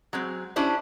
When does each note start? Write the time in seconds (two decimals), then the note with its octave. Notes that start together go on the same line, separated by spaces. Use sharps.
0.13 F#3 G#3 C4
0.56 C#4 D4 E4 G4 C5